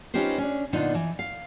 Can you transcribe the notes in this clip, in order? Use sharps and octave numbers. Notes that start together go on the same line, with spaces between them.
C#4 D#4 F4 G4 B4 C5
C#4 D4
A#2 D3 B3 D4 D#4 F4
E3
F5